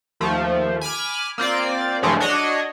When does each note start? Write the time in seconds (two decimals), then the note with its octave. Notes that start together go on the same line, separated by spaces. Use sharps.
0.20 D#2 F3 A3
0.81 G#5 B5 D6 F6
1.38 A#3 C4 F4 D5
2.02 G2 C#3 E3 F3 G#3 A3
2.20 D4 F#4 C#5 D#5